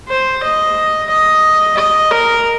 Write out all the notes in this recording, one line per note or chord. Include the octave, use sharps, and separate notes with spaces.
C5
D#5
D#5
D#5
A#4